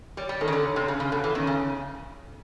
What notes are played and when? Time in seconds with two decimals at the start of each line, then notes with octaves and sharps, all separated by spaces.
0.17 G3 C#5
0.29 G3
0.41 D#3 A4
0.48 C#3
0.53 D3
0.64 C#5
0.76 C3
0.88 C#3 C#5
1.00 C#3
1.12 B2 A4
1.24 E3
1.35 D#3 C#4
1.47 C#3